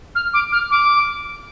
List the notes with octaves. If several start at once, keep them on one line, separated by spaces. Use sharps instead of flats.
F6
D6
F6
D6